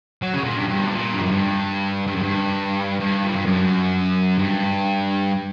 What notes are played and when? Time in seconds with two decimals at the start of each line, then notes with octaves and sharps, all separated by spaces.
0.22 F#3
0.34 C#3
0.44 A#2
0.57 G2
0.69 G2
0.79 B2
0.91 A#2
1.14 G2
1.23 F#2
1.31 G2
2.07 G2
2.16 F#2
2.23 G2
3.00 G2
3.24 A#2
3.35 G2
3.46 F#2
4.38 G2